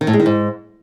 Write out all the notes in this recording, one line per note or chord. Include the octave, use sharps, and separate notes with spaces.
D#3
A2
G#3
D#3
G#2